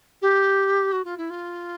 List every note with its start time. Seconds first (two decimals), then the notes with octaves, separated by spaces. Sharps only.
0.21 G4
0.92 F#4
1.04 F4
1.17 E4
1.30 F4